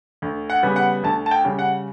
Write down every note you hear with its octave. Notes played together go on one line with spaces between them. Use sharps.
D2
F#5
C#3 G3 B3
F#5
D2 A5
A5
G5
C#3 G3
F#5